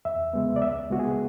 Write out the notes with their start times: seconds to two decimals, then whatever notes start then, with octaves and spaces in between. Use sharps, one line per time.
0.05 E2 E5
0.33 C#3 G#3 B3
0.56 D5
0.61 C#2 E5
0.90 C#3 G#3 B3 F#4
0.99 G#4